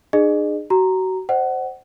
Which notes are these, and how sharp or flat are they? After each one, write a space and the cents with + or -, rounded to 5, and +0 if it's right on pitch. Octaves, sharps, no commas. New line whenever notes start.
D#4 -45 G#4 +0 D#5 -40
F#4 +30 A#5 -5
C5 +0 D#5 -40 F#5 +25